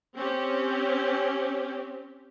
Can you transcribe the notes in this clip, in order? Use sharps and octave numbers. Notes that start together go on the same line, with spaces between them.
C4 C#4 G4